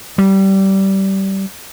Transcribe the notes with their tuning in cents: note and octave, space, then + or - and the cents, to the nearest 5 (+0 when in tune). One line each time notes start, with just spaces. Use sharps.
G3 -20